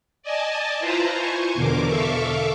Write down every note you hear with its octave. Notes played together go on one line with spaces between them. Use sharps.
D5 D#5 G#5 A5
E4 F4 B4 C5 A5 A#5
C5 G#5 C#6
E2 B2 D3 A#4 D6
A4 E5 F5 C#6 D6